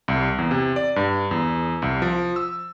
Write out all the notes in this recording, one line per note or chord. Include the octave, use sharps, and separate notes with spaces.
C2
E2
C3
D5
G2
E2
C2
F3
E6